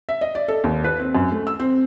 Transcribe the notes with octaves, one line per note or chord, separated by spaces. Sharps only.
E5
D#5
D5
A4
D#2
B4
C4
F#2
A3
E6
C4